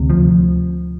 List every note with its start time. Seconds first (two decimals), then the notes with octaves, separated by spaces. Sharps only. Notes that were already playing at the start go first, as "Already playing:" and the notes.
Already playing: D2 C3
0.10 F3